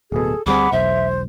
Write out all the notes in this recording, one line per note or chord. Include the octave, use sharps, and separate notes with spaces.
D1 B2 G#4 A4
D2 G3 C4 G#4 F#5 B5 D6
E1 B1 C5 E5